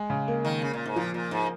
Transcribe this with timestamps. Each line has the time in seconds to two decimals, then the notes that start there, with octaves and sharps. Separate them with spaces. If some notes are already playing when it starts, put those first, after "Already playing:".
Already playing: G#3
0.10 C#3
0.28 A#3
0.45 D#3
0.62 C#3
0.74 A#2
0.86 G#2
0.96 A#2 F3
1.14 A#2
1.31 G#2